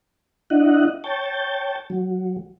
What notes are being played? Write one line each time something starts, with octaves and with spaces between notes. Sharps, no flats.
D4 E4 D#5 F#5
C#5 G5 A5
F#3